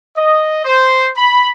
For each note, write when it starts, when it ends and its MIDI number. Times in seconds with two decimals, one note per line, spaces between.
0.17 0.62 75
0.65 1.08 72
1.16 1.50 83